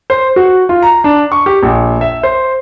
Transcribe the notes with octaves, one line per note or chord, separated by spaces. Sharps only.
C5
F#4
F4
A#5
D4
C#6
G4
A#1
E5
C5